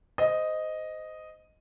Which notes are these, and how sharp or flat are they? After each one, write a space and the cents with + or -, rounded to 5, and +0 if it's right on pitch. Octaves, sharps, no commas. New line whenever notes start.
C5 -25 D#5 +0